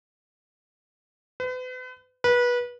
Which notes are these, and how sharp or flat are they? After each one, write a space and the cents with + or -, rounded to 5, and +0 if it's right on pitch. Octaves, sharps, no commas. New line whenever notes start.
B4 +40
B4 -25